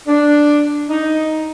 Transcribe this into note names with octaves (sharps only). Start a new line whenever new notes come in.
D4
D#4